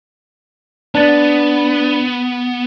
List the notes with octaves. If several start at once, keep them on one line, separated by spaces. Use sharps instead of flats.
B3 D4 A6